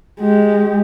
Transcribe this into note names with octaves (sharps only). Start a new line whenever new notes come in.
G#3 G4